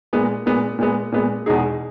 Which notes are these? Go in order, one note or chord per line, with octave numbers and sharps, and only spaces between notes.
A#2 G#3 B3
A#2 G#3 B3
A#2 G#3 B3
A#2 G#3 B3
E2 B2 G#3 D#4 G#4